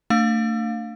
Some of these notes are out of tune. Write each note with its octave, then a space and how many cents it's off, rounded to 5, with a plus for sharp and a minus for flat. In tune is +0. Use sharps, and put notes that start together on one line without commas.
A3 +30 D4 +0 F5 +20